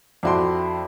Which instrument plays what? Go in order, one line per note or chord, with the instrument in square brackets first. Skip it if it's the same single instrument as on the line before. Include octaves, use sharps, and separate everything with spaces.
[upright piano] F2 F#4 C6 [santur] D4 E4 G5